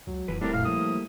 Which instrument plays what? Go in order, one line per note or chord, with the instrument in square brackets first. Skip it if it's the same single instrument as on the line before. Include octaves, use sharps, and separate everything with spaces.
[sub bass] C#2 [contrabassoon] F#3
[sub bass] D1 [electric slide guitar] F2 E3 B4
[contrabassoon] A2 [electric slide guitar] G3 C4 A#4 [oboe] D4
[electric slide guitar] F#2 A#2 [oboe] F5
[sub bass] F3 [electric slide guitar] G3 A#3 [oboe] D#6